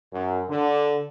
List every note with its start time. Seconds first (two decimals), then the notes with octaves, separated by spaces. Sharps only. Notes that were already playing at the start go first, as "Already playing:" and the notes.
0.12 F#2
0.48 D3